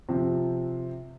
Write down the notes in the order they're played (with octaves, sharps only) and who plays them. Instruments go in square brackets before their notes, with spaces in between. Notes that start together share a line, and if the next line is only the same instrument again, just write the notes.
[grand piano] C3 F3 C4